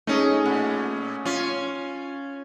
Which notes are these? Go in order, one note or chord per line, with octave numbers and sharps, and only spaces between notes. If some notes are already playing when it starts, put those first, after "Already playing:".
A3 C#4 D#4 G#4
A#2
C#4 F4